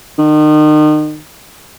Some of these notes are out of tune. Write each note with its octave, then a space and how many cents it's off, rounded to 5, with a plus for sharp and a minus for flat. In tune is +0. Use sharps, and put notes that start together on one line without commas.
D#3 -35